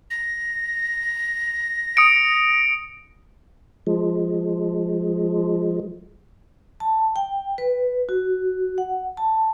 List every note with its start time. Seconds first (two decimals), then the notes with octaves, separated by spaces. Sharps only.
0.11 A#6
1.97 D#6 C#7 D7
3.87 F3 G#3
6.80 A5
7.16 G5
7.58 B4
8.09 F#4
8.78 F#5
9.17 A5